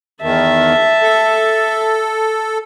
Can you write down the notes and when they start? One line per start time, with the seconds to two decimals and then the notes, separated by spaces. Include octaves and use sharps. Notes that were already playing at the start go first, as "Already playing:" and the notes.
0.22 E2 D#3 E5 A5
1.02 A4